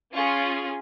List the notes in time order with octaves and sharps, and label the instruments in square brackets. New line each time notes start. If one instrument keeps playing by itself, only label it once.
[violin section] C#4 F4 G#4 C#6